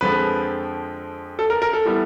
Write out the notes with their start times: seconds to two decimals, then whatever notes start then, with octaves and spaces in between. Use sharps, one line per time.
0.01 F2 D3 F3 G#3 B4
1.39 A4
1.50 A#4
1.62 A#4
1.73 A4
1.85 E3 G3 B3